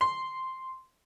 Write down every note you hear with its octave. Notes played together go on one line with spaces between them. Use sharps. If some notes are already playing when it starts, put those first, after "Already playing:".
C6